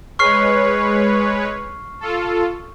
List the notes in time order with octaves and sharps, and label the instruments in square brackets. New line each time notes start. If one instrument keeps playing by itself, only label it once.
[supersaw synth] G#3 B4 C#5 [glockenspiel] C#6 F6 C7
[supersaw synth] F4 A4